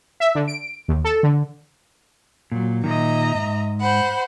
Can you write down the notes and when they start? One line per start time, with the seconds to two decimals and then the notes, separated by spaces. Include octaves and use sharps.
0.20 E5
0.35 D3
0.48 D7
0.88 D#2
1.05 A4
1.23 D3
2.52 A#2 F#3
2.84 A#2 D#3 D#5 E5 A#5
3.34 G#2
3.81 C5 F#5 B5